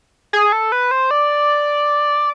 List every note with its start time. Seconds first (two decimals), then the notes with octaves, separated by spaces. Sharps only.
0.33 G#4
0.52 A4
0.72 B4
0.91 C5
1.11 D5